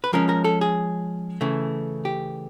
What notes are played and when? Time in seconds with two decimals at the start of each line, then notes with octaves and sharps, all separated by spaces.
0.04 B4
0.13 F3 G#3 C#4 A#4
0.29 A#4
0.44 A4
0.61 G#4
1.41 C#3 E3 A3
2.05 G4